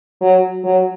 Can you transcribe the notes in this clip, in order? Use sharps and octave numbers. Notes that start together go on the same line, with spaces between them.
F#3
F#3